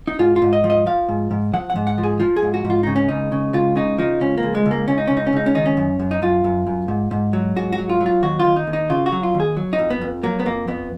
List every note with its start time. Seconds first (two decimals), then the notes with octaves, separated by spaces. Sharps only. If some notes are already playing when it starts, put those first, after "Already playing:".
0.08 D#4
0.19 G#2 F4
0.36 F4
0.42 G#2
0.53 D#5
0.64 F3
0.70 D#5
0.86 F3 F5
1.09 G#2
1.31 G#2
1.53 F3 F#5
1.70 F#5
1.76 G#2
1.87 F#5
1.98 F3
2.04 G#4
2.20 F3 F4
2.36 G#4
2.43 G#2
2.54 F#4
2.65 G#2
2.70 F4
2.83 C#3 D#4
2.96 C#4
3.08 C#2 D#4
3.32 C#3
3.54 C#2 F4
3.76 C#3 D#4
3.98 F3 D#4
4.20 C#2 C#4
4.38 A#3
4.43 C#2
4.55 G#3
4.66 C#2
4.71 A#3
4.88 C#2 C#4
4.98 D#4
5.08 C#2 C#4
5.17 D#4
5.27 C#4
5.33 C#2 D#4
5.46 C#4
5.55 D#3 D#4
5.66 C#4
5.77 F#2
6.00 F#2
6.11 D#4
6.22 F#2 F4
6.44 F#2
6.67 F#2
6.88 G#2
7.11 G#2
7.33 F#3
7.56 G#2 F#4
7.72 F#4
7.78 F#3
7.89 F4
8.01 F#3
8.06 F4
8.22 D#2 F#4
8.40 F4
8.45 D#2
8.56 D#4
8.67 D#2
8.73 D#4
8.90 C#3 F4
9.06 F#4
9.12 F#3
9.23 F4
9.34 D#2
9.40 G#4
9.57 F#3
9.73 D#4
9.79 F2
9.90 B3
10.01 F2
10.23 F#3 A#3
10.40 B3
10.46 F2 A#3
10.68 F2 B3